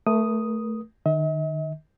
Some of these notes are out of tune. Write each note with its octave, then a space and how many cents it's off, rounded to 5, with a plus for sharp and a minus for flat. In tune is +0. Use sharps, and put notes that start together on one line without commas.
A3 +0 A#4 +40 D#6 +0
D#3 -35 D#5 +45